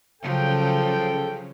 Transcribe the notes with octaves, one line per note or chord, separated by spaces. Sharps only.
C#3 F3 F#3 A4 G5